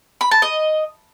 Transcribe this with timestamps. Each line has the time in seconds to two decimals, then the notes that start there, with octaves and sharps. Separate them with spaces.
0.21 B5
0.31 A5
0.42 D#5